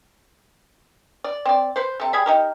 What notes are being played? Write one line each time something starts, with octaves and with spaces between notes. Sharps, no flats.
D5
C4 D5
B4 C5
C3 A4
G3 G#4 B5
D#4 G4 A#4